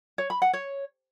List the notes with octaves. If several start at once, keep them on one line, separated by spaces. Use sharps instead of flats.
C#5
B5
F#5
C#5